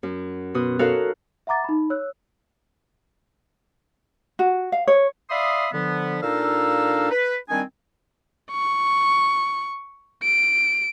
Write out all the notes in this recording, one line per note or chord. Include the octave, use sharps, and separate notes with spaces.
F#2
B2 F#4 C6 D#6
D#4 F#4 A4 A#4 C#5 F5
E5 F#5 A#5 D6 A6
D#4 B5
C#5 E6 F#6
F#4
F5
C#5
D5 E5 F5 B5 C6 D#6
D3 F3 B3
A#2 D4 D#4 A4 F5 E6
B4
D#3 G3 C4 D4 G#5
C#6
D7